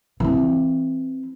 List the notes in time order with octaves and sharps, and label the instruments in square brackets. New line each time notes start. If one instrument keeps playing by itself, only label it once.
[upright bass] E3 C4